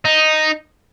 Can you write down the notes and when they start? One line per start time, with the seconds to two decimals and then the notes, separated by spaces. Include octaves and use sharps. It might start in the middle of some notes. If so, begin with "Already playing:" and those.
0.05 D#4